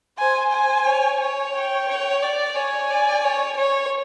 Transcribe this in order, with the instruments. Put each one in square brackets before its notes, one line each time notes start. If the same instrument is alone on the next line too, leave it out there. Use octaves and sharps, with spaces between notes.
[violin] C5 [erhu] G#5
[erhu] G#5
[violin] C#5
C#5
[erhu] G5
[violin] C#5
D5
[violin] C#5 [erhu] G#5
[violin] D5
C#5
C#5